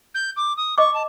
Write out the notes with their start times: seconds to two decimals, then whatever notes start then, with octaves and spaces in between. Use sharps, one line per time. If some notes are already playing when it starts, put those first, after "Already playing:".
0.15 G6
0.37 D6
0.57 D#6
0.78 D#5 C#6 D6
0.94 A5